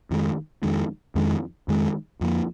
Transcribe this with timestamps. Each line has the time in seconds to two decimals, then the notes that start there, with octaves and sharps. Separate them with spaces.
0.11 F2 D#3 G#3
0.63 F2 D#3 G#3
1.15 F2 D#3 G#3
1.68 F2 D#3 G#3
2.21 F2 F3 A#3